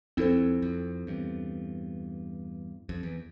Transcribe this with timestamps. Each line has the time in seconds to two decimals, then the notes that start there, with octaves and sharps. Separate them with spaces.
0.17 F2 C4 E4 A4 C5
0.62 F2
1.07 E2 G2
2.89 F2
3.03 E2